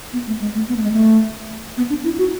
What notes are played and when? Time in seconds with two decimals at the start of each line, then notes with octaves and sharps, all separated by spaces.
0.13 B3
0.27 A3
0.40 G#3
0.55 A3
0.68 B3
0.76 A3
0.84 G#3
0.92 A3
1.77 B3
1.90 D4
2.04 E4
2.18 F#4